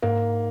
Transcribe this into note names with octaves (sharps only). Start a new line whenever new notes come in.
G#2 A#3